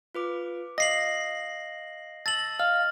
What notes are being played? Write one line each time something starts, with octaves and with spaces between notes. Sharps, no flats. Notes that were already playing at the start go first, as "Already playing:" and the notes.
F4 B4 D6
D#5 F5 A#6 C7 F#7
A5 E6 A6 A#6 F#7
D#5 F5 F6